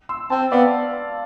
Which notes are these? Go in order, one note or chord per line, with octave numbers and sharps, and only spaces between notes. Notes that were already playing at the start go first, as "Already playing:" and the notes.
C6 E6
C4 A5 C6
B3 D5 F5